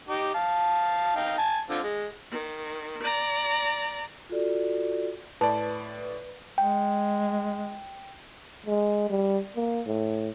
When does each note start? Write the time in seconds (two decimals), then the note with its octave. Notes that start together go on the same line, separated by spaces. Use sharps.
0.09 D#4 G4
0.34 F5 A5
1.16 D#4 F5 G5
1.38 G#5 A5
1.70 D3 C4 F4
1.83 G#3
2.31 D#3
3.03 D5 A#5
4.29 F4 F#4 A4 D5
5.41 A2 B4 D5 A5
6.58 G#3 G5
8.66 G#3
9.10 G3
9.56 A#3
9.86 A2